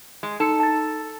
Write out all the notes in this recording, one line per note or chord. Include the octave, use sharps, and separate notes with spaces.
G#3
D#4 A4 C#7
A5 A6